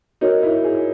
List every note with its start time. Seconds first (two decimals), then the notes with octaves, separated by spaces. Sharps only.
0.21 D#4 F#4 A#4 C#5
0.43 E4
0.64 G#4